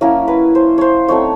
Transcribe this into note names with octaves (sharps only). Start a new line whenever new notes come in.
F#3 A#3 C#4 E4 A#4
B4
C5
C5 C#5
F#3 A3 C4 D#4 C#5